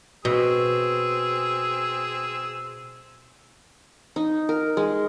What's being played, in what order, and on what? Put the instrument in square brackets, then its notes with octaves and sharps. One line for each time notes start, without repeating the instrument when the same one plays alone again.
[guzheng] B2 [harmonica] C4 G#4 E6
[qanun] D#4
A#4
G#3